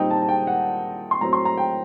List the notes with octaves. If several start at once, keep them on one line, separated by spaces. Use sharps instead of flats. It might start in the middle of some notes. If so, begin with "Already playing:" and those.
Already playing: A#2 G3 C4 D#4 D#5 G5
A5
A5
G5
F#5
C6
A2 F#3 C4 A#5
C6
A#5
G5